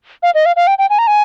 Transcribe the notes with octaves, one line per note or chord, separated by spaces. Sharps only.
F5
D#5
F5
F5
G5
G5
G#5
A#5
G#5